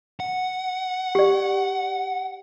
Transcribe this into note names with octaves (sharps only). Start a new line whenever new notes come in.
F#5
G4 D5